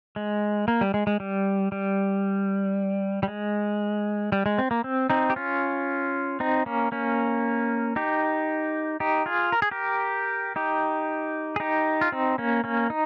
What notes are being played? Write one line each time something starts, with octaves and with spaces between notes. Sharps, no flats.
G#3
A#3
G3
G#3
G#3
G3
G3
G3
G#3
G3
G#3
C4
A#3
C4
C4 D#4
G4
C#4 F4
C4 D#4
A#3 C#4
A#3 C#4
D#4 G4
D#4 G4
F4 G#4
A#4
G#4
G4 A#4
D#4 G4
G#4
D#4 G4
F4
C4 D#4
A#3 C#4
A#3 C#4
D#4